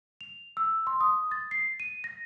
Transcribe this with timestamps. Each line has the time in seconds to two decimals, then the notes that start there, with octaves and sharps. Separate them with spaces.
0.21 F7
0.57 E6
0.87 C6
1.01 D#6
1.31 A6
1.51 C7
1.80 D#7
2.04 A#6